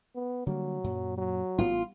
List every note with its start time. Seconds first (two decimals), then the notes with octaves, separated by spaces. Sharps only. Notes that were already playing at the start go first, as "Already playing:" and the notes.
0.15 B3
0.47 D3 F#3 G3 A#3
0.84 F#2 A#2
1.18 F#3
1.58 A1 B3 F4